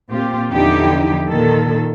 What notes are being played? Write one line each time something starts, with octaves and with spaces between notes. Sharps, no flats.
A#2 C4 F4 G4
E2 D3 F3 D#4 E4 G4
A#2 D#3 A4